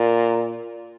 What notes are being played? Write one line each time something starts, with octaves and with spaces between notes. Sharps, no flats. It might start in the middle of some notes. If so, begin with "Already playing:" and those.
Already playing: A#2